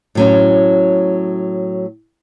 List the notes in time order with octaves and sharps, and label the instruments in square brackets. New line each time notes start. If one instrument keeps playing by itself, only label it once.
[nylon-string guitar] A2 F#3 C#4